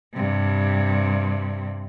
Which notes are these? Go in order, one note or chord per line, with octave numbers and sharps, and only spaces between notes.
G2 C3